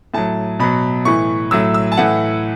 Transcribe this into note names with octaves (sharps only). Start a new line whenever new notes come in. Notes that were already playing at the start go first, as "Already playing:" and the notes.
A2 F#3 A5
B2 F#3 B5
A2 E3 C#6
A2 F#3 E6
E6
A5
A2 E3 F#5